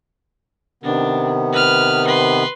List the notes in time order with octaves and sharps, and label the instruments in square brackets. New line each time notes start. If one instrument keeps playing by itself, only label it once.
[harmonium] C3 D#3 B3 [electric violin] D4
[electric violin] B4 F6
B4 C6